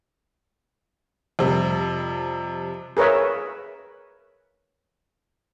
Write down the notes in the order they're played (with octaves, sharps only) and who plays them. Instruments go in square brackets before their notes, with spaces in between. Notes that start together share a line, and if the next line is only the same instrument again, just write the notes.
[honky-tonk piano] F2 C3 G3
[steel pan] G#4 A#4 B4 C#5 E5